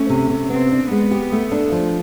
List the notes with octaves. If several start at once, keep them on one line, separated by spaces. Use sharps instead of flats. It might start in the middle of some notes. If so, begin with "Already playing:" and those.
Already playing: A3 C#4
C3
C3
B3 C4
D4
G#3 B3
G4
A3
D4
F3